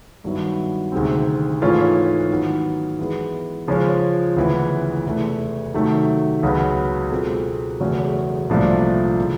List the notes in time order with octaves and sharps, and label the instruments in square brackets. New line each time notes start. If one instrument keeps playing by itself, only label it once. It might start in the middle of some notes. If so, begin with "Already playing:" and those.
[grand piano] G2 D#3 F#3 B3 E4
D2 C3 D#3 G#3 C4
G#2 E3 A3 C#4 F4
D#3 F#3 B3
E3 G#3 B3
C#3 F3 G#3 C#4
D2 C#3 E3 G#3 B3
E2 C3 E3 A3
C3 D#3 F#3 A3
C#2 C#3 F#3 B3
B2 G#3 C4 F4 A4
E2 C#3 F#3 A3 C#4
C2 A#2 F3 A3 D4
C#3 E3